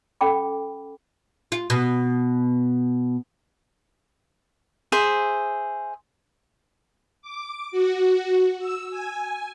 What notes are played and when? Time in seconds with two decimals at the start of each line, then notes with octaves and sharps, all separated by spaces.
0.21 C#4 A4 F#5 G5 B5 D6
1.52 F4
1.70 B2
4.92 G#4 C5 E5
7.22 D6
7.71 F#4
8.59 E6
8.91 G#5